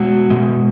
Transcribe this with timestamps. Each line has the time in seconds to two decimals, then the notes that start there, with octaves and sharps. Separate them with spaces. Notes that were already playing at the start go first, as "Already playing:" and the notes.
Already playing: B2 G#3 F#4
0.30 B2 G#3